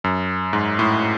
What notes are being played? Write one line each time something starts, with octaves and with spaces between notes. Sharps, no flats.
F#2
G#2
A2